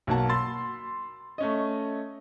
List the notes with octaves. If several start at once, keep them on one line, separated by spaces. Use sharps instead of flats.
B1 A#3 F#4 F#5 A5
B5 C6 E6 A6
A3 C#4 D#5